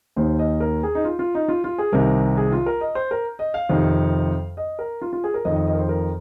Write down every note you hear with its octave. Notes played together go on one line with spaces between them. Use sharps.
D#2 D#3 C5
D#5
A#4
G#4
D#4
F4
F4
D#4
F4
F4
G#4
C2 C3 D#3 A#4
G#4
F4
A#4
D#5
C5
A#4
D#5
F5
F2 C3 D#3
D#5
A#4
F4
F4
G#4
A#4
F2 D#3 D#5
D#5
D#5
A#4
C5
A#4